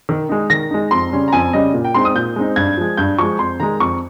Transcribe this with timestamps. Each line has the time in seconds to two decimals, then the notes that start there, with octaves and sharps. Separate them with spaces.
0.09 D#3
0.29 G#3 D#4
0.50 D#3 A#6
0.71 G#3 D#4
0.91 F2 C6
1.12 C#3 G3 C#4
1.28 A#5
1.33 F2 G#5
1.53 C#3 G3 C#4 D#5
1.74 A#2
1.85 G5
1.94 G#3 C4 D#4 C6
2.05 D#6
2.15 A#2 G6
2.36 G#3 C4 D#4
2.56 G2 G#6
2.77 F3 G#3
2.97 G2 G6
3.18 F3 G#3 C#6
3.39 F2 C6
3.60 D#3 G#3 A#5
3.80 F2 C#6